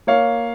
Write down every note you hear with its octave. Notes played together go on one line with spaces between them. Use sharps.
A#3 C#5 F5